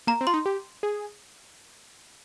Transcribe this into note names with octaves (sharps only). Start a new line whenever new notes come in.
A#3 A#5
C4
F4 C6
D#4
G4
G#4